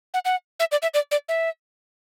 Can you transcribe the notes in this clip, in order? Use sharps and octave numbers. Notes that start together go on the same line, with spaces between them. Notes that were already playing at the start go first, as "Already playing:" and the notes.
F#5
F#5
E5
D5
E5
D5
D5
E5